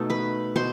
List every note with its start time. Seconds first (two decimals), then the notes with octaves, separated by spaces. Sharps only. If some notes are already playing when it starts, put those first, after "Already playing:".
Already playing: B2 A3 D#4 A4
0.10 B4 B5
0.56 B2 C5 C6